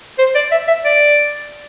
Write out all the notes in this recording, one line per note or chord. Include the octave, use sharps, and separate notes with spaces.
C5
D5
E5
E5
D5